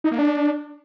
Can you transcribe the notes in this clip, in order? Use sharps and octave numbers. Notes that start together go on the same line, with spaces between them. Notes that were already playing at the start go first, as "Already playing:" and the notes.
D#4
A#3
D4